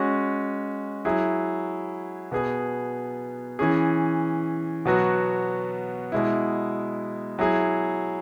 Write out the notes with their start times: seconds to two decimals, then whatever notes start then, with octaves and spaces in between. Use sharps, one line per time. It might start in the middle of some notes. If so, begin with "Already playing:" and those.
Already playing: G#3 C#4 F#4
1.05 F#3 E4 G#4
2.32 B2 B3 G#4
3.59 E3 C#4 G#4
4.85 B2 F#3 B3 F#4
6.12 B2 G#3 E4
7.39 F#3 E4 G#4